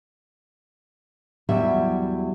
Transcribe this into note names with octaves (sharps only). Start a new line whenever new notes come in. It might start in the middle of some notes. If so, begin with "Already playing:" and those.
E2 F#3 G3 E5